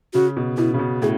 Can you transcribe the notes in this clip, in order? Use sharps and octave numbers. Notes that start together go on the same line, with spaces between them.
C#3 F#4
B2
B2 E4
C#3
B2
A2 G#4